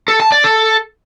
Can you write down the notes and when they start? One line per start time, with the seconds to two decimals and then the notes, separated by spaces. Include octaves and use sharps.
0.08 A4
0.20 A5
0.32 D5
0.44 A4